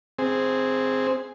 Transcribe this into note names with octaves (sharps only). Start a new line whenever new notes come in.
C4 G#4